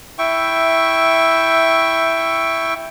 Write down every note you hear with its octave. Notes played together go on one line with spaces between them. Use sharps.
E4 E5 G5 C#6